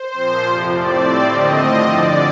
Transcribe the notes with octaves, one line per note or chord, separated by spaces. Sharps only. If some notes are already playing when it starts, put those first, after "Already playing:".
Already playing: C5
A#2 F3 C4
F2 C3 F3
A2 A3 C4 D5
A2 G3 C4 D5
D#2 D3 A3 C4 D#5
A2 F3 C4
G2 D3 F3 C4 D5